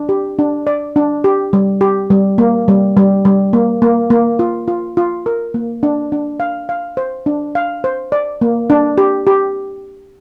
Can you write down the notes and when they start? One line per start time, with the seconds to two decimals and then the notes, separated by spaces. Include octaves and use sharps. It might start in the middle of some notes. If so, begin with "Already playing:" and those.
Already playing: D4
0.09 G4
0.39 D4
0.67 D5
0.96 D4
1.24 G4
1.53 G3
1.81 G4
2.10 G3
2.38 A#3
2.68 G3
2.97 G3
3.25 G3
3.53 A#3
3.82 A#3
4.10 A#3
4.39 F4
4.68 F4
4.97 F4
5.26 A#4
5.54 A#3
5.83 D4
6.12 D4
6.40 F5
6.69 F5
6.97 C5
7.26 D4
7.55 F5
7.84 C5
8.12 D5
8.41 A#3
8.70 D4
8.98 G4
9.27 G4